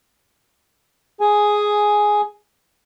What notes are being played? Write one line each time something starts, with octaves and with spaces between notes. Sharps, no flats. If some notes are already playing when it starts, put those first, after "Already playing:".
G#4 G#5